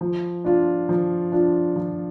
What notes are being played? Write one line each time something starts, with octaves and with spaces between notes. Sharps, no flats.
F3
D4 F4
F3
D4 F4
F3